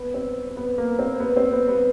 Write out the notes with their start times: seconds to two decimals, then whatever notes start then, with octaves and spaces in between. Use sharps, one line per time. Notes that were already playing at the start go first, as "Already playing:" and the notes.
Already playing: B3
0.14 C4
0.57 B3
0.78 A#3
0.99 C4
1.20 B3
1.36 C4
1.52 B3
1.68 B3